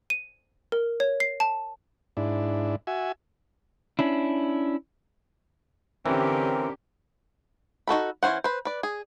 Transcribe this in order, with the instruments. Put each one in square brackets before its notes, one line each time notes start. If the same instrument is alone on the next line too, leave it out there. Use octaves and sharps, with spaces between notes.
[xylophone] D#7
A#4
C#5
C7
A5
[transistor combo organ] G#2 D4 E4
F#4 E5 G#5
[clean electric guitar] C#4 D4 E4
[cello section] D3 C#4 G4 [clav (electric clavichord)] E3 [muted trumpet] C4 [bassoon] A#4
[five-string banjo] D#4 F#4 A4 B5
E3 C#4 F#4 C5 F#5
B4 C5
B4 D5
G#4